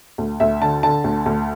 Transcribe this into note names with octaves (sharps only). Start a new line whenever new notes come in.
D2
D2 E5
D3 A5
D3 A5
D2
D2